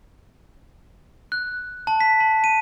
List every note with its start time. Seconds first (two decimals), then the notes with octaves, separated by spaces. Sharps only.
1.32 F#6
1.87 A5
2.00 B6
2.20 A5
2.44 D#7